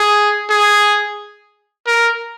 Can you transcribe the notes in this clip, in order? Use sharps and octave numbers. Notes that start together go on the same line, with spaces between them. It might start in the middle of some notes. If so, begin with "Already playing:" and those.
Already playing: G#4
G#4
A#4